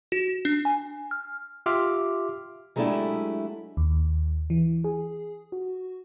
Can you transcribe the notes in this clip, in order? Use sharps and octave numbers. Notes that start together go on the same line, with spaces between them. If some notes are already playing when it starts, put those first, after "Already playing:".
F#4
D4
G#5
F6
F4 G4 E5 C6 D6 F6
F#3 G#3 A3 D4 E4 G4
D#2
E3
G#4
F#4